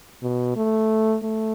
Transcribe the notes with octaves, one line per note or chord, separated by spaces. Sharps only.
B2
A3
A3